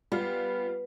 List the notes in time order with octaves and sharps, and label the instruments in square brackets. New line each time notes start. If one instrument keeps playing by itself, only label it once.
[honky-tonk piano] G3 F4 [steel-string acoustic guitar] B3